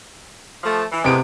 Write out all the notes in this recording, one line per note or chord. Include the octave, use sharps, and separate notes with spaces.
F3 A3
E3
A2 C3 G#3 B3 D7